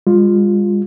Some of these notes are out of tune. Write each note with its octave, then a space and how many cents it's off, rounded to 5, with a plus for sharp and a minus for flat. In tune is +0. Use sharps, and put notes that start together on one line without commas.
G#3 -45 F4 +10